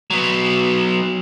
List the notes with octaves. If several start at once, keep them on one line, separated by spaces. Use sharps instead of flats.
F#3 B3